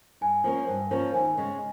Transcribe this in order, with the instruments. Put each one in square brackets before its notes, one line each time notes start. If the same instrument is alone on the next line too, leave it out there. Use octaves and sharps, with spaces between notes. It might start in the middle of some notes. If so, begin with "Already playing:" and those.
[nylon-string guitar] G2 [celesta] G#5
[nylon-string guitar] F3 A#3 C#4
G2
F3 A#3 C#4
[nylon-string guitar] D#2 [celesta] G#5
[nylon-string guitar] C#3 G#3